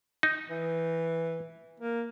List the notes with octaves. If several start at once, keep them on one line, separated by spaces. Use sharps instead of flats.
D#4
E3
A#3